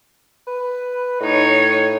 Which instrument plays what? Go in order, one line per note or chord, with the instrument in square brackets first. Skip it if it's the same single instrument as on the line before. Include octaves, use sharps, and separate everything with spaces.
[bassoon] B4
[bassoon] A2 [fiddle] D#4 C#5